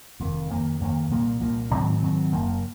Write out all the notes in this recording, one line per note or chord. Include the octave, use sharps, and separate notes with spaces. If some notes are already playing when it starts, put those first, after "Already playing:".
F1 F2 D#3
F2 D#3 A#3
F2 D#3 A#3
C2 A#2 F3 A#3
C2 A#2 F3 A#3
G#2 D#3 F#3 C4
G#2 D#3 F#3 C4
F#1 F#2 F3 A#3